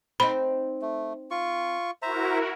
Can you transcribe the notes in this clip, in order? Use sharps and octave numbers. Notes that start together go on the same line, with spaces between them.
C4 D#4 B5
A3
F4 C#6
E4 F#4 A#4 C5 E5 A#5